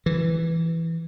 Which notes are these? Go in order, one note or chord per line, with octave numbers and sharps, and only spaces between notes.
E3